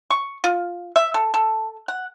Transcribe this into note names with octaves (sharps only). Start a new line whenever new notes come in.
C#6
F4
E5
A4
A4
F#5